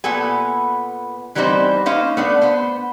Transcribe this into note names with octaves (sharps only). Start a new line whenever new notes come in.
A#2 B3 A4 G#5
E3 G3 B3 C4 D#4 C5
A#3 C#4 D#4 C5 F5
A3 B3 D4
B3 C5